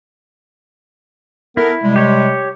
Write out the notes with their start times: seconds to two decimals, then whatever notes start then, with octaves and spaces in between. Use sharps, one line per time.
1.57 B3 E4 A4 A#4
1.84 C3 G3 G#3
1.96 G4 C#5